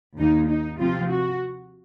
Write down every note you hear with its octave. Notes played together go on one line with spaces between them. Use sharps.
D#2 D#3 A#3 D#4
D#4
C3 F3 C4 F4
F#4